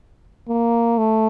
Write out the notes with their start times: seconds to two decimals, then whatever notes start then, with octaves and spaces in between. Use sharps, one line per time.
0.48 A#3
0.98 A3